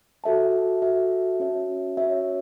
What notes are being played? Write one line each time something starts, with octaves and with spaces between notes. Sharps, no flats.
F#4 A4 E5 A5
F#4 A4 E5 A5
C#4 F#4 C#5 E5
C#4 F#4 C#5 E5